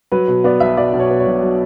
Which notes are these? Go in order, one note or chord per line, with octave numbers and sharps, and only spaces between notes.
F#3 B4
B2
B3 D5
B1 E5
F#3 D5
B2
C#5
B3
C#5
B1
F#3